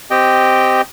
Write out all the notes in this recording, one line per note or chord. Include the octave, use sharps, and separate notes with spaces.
C4 G4 D#5 G5